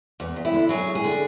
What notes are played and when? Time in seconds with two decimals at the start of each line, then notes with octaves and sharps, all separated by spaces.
0.20 E2
0.36 E2
0.45 E4
0.54 D3
0.69 F#3 G#4
0.87 E2
0.95 G#4
1.04 D3